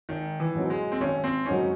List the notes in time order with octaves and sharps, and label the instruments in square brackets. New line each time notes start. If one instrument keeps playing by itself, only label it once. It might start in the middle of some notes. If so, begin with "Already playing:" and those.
[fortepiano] G#1 [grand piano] D#3
[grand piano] E3
[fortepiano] G#2 F#3 C4 D#4
[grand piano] G#3
C4
[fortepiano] G#1 [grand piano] C#4
[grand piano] C4
[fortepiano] G#2 F#3 C4 D#4 [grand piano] C#4